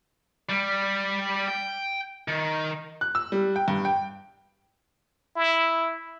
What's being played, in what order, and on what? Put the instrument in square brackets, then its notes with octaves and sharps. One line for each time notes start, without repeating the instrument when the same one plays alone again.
[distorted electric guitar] G3
G5
D#3
[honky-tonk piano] F#6
E6
G3
G5
G2
G5
[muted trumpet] E4